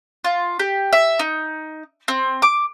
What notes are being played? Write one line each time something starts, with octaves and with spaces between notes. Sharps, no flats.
F4
G4
E5
D#4
C4
D6